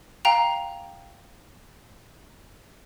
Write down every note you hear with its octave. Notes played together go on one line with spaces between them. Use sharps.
F5 G5 A#5 F7